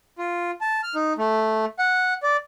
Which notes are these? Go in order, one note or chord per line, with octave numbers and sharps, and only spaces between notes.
F4
A5
F6
D#4
A3
F#5
D5